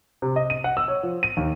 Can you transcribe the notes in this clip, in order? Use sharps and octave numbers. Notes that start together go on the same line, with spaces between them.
C3
D#5
D#7
F#5
E6
C#5
F3
D#7
D#2